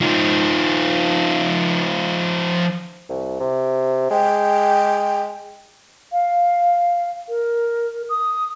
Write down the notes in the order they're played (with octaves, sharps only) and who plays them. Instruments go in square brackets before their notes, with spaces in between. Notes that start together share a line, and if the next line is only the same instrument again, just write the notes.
[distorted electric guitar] F3 D#4
[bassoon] C2
C3
[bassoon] G#3 [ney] G5
[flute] F5
A#4
D#6